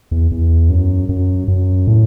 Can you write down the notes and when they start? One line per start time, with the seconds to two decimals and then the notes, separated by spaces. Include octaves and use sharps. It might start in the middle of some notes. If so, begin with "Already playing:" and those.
0.11 E2
0.32 E2
0.70 F#2
1.09 F#2
1.48 F#2
1.88 A2